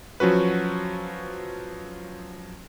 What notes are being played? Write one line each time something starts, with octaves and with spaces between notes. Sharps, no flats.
F3 F#3 C#4 F#4 B4